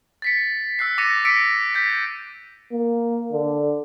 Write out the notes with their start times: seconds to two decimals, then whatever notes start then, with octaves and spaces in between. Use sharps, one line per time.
0.22 A6 B6 C#7
0.79 E6 F#6 C7
0.98 D6 A6 A#6 C#7 D#7
1.25 E6 B6 C#7 D7
1.74 G6 A6 B6
2.72 A#3
3.32 D3